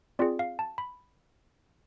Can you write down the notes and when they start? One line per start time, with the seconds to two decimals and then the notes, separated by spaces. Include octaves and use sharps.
0.19 C4 F4 G#4 D5
0.39 F5
0.59 A5
0.78 B5